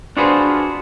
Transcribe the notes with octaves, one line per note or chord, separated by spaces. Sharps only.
D4 F4 F#4 G#4 B4 C5